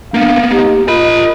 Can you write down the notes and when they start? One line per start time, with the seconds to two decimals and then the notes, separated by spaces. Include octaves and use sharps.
0.14 A#3 B3 D4 F5
0.51 D#4 G4
0.88 F4 A#4 D#5 B5